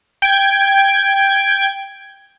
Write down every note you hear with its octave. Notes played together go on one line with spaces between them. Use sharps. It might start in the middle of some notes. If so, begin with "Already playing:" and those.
G5 G#6